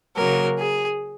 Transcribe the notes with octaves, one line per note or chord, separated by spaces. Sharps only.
C#3 F#3 A#3 A#4
G#4